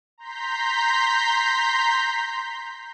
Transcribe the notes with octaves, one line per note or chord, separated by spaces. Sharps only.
A#5 C6 G6 B6